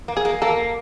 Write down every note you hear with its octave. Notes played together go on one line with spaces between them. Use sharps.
A#3
G#4
A#3
A#3 A4